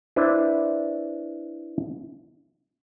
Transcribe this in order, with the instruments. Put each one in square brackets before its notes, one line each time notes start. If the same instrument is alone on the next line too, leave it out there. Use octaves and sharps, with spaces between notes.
[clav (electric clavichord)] D4 E4 B4 C5